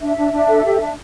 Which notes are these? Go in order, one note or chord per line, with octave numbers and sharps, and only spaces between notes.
D4 E5
D4
D4
A4
G4
D4